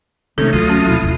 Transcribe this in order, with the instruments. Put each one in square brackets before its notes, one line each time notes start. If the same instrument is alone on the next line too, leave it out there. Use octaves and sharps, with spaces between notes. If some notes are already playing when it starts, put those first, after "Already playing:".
[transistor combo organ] C3 D#3 C#4 [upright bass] G#3 [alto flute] A3 [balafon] A4
[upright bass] D2 [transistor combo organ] F#3 F4 D#6
[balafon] C#4
[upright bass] D#2 B2 [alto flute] E4
[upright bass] A1 E2 [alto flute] E4